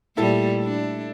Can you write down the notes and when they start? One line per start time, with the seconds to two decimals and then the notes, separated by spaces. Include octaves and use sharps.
0.17 A#2 G3 A3 E4 A4
0.63 D4